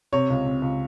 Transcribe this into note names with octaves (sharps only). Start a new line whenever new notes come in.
C3 C#5
C#2
C3
C#2